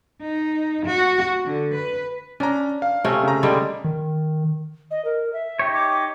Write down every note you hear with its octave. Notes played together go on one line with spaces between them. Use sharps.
D#4
F#4
D3
B4
C#4 D4 A#5
F5
C3 A3 C#4
C#3 A#5
D3 G3 G#3
D#3
D#5
A#4
E5
D#4 G4 C#5
D6